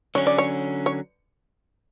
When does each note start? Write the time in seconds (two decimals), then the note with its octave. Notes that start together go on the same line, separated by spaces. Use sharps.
0.15 D3 F#3 C#4 C#5
0.27 D5
0.38 C#5
0.86 C#5